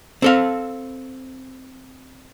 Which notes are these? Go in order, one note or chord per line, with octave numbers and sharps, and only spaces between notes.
C4 A4 F5